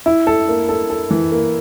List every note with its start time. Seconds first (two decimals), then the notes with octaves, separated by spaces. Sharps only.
0.06 E4
0.27 A4
0.49 A#3
0.69 A4
0.90 A4
1.11 E3
1.32 A#3